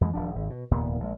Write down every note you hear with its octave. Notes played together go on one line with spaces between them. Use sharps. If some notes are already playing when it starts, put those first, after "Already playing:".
F2 E3 F#3 G#3
D#1 F3 D4
G#1 D#2
B2
F1 D#2 A#2 B3
A#1 G#3